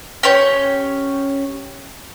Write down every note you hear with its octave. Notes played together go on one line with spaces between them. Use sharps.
C#4 G4 C#5